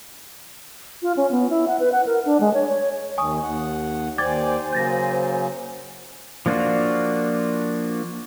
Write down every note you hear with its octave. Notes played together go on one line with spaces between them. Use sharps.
F4
C#4
B3
E4
F#5
B4
F#5
A#4
D4
G#3
C#5
C#5
D#2 D#3 G#5 C#6 D#6
D#2 F#5
D#2 C5 D5 G5 G#5 D6 G#6 A6
C#3 F#3 A#3 G6 A6 A#6
F3 A#3 D4 F4 F#4